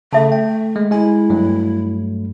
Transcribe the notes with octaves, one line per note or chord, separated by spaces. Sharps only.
C#3 A3 A4 E5 A5
G5
G#3
G#3 E4 G#5
G2 F#3 A3